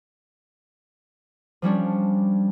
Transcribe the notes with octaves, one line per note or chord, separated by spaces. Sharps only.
F3 G3 C#4 D4